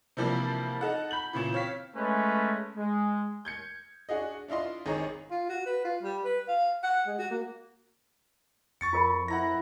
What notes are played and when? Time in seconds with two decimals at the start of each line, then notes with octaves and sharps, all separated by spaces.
0.17 C3 E3 F3 G3 A#3 D4
0.81 D#4 A4 F#5
1.11 B5 G6 F#7
1.33 A#2 C#3 E3
1.53 C4 C#5 F5 B6
1.96 G#3 A3 C#4 B4
2.75 G#3
3.45 G6 G#6 C#7
4.09 D4 F#4 G#4 D#5
4.48 D4 E4 F4 D#5 C6
4.86 G#1 D#4 G#4 C#5 A#5
5.31 F4
5.49 F#4
5.66 B4
5.84 F4
6.03 G3
6.24 B4
6.48 F5
6.84 F#5
7.07 G#3
7.19 F#4
7.30 A#3
8.81 F2 C#6 A6 C#7
8.93 F4 A#4 B5
9.28 E4 F#5 A#5 A#6